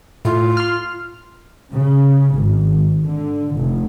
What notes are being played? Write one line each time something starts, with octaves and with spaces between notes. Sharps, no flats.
A2 F4
C6 F6
C#3
G#1
D3
F1